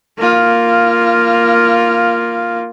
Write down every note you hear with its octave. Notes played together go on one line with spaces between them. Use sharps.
A#3 F4